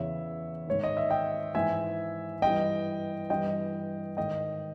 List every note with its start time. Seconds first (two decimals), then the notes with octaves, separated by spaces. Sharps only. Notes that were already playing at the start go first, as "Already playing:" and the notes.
Already playing: E2 C#3 E3 C#5 E5
0.67 G#2 D#3 C#5
0.84 D#5
0.97 E5
1.10 D#5 G5
1.55 G#2 E3 E5 G#5
2.42 G2 E3 D#5 G5
3.30 G2 E3 D#5 G5
4.17 G#2 D#3 D#5 G5